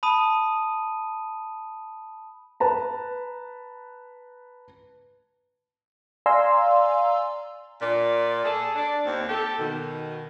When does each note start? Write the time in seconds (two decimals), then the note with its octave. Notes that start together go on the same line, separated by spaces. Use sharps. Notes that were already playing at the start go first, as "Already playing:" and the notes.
0.03 A5 B5 D#6 D#7
2.60 B4 A5 A#5
6.26 D5 F5 G#5 A#5 C6 E6
7.80 A#2 D5
8.44 G#4 A4
8.75 D4 D5
9.06 D#2 C4
9.29 G4 A4
9.58 B2 D#3